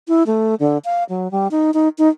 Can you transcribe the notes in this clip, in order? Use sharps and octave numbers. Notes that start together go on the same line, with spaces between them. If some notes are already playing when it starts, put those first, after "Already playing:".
E4
A3
D3
F5
F#3
G3
D#4
D#4
D#4